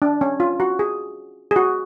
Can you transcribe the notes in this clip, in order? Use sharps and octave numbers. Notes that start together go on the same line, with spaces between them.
D4
C#4
F4
F#4
G#4
G#4
F#4